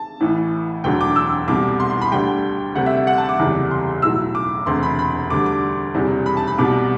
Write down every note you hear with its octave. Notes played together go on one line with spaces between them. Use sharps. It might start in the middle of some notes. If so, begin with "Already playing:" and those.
Already playing: A5
A1 A2 E3
E1 D2 D3 F#3 G5
D6
E6
C2 B2 G3 D6
C6
C6
B5
D2 D3 G3 G5
D2 C3 G3 F#5
E5
E5
F#5
A5
D6
F#1 E2 C3 G3
C6
B1 A2 F#3 E6
D6
E1 D2 C3 C6
B5
B5
D2 D3 G3 D6
D6
E1 E2 C3 G3
B5
A5
B5
C2 B2 G3 D6